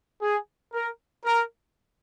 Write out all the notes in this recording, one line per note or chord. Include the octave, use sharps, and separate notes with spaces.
G#4
A#4
A#4